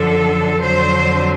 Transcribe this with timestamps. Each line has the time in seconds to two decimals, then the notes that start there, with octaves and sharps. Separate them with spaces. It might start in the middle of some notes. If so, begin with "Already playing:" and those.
Already playing: F#2 D3 F3 A4
0.60 F2 D3 F#3 C5